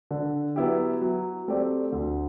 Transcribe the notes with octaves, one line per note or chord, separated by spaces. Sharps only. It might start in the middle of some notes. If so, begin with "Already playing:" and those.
D3
F#3 B3 E4 G4
F#3
A3 C4 G4 D5
D2